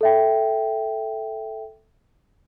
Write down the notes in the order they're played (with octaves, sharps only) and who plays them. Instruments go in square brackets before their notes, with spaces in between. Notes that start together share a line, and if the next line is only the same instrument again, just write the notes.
[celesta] A4 E5 G5